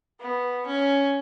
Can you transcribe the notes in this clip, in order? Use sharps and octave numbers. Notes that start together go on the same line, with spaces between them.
B3
C#4